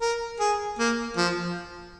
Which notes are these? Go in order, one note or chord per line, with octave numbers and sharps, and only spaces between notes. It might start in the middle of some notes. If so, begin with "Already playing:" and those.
A#4
G#4
A#3
F3